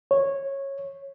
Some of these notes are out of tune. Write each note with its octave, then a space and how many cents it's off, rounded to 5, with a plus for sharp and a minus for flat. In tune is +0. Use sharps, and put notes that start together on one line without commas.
C#5 -15